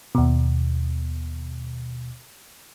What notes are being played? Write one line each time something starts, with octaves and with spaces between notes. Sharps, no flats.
D#2 B2